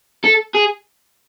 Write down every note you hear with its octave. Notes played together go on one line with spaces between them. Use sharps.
A4
G#4